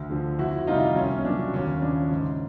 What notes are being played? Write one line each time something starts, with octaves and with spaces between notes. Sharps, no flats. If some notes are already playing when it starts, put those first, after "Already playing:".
Already playing: D2
D3 F3
F2 E4 F#4
C3 D#3 G3 D#4 F4
C2 C#4
C#4
A#2 F#3 D4
D#2 C#4
C#3 F3 D4
G#2